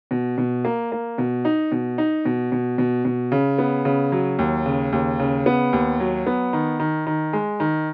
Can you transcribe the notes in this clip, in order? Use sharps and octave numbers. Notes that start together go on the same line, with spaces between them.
B2
B2
A#3
A#3
B2
D#4
B2
D#4
B2
B2
B2
B2
C#3
B3
C#3
F#3
D#2
C#3
D#2
C#3
B3
D#2
F#3
B3
D#3
D#3
D#3
G#3
D#3